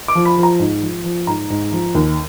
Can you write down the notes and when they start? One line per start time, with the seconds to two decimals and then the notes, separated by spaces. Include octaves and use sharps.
0.08 D6
0.15 F3
0.25 B5
0.37 F3
0.43 A#5
0.59 G#2
0.82 F3
1.04 F3
1.27 G#2 A#5
1.50 G#2
1.72 F3
1.95 D#2